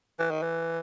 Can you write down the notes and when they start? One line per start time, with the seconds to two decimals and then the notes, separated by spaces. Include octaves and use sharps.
0.19 E3
0.31 D#3
0.43 E3